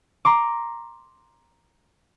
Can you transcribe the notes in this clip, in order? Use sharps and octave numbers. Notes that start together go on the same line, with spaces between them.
A#5 C6 D6